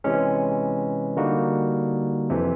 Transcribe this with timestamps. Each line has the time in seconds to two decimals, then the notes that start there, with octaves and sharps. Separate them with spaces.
0.04 C3 E3 G#3 C#4
1.17 D3 G3 A#3 D#4 F#4
2.30 F2 C3 E3